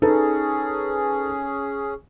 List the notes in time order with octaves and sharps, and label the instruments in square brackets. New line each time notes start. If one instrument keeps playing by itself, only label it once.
[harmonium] C#4 G#4 [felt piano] D#4 A4 B4